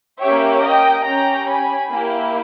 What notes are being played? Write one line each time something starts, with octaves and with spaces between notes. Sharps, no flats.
A#3 C#4 G4 C#5 E5
D#5 G5
C#4 G5 A#5
G4
G#5 B5
A#3 E4 G4